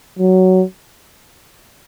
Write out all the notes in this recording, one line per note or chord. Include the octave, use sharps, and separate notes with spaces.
F#3